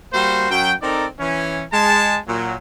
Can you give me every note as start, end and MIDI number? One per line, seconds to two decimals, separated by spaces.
0.13 0.50 55
0.13 0.50 58
0.13 0.50 66
0.13 0.50 72
0.50 0.72 42
0.50 0.72 54
0.50 0.72 79
0.82 1.06 60
0.82 1.06 63
0.82 1.06 69
0.82 1.06 70
0.82 1.06 74
1.20 1.62 52
1.20 1.62 61
1.73 2.18 56
1.73 2.18 81
2.27 2.55 46
2.27 2.55 54